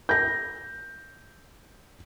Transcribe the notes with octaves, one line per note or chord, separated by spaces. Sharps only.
G6 A#6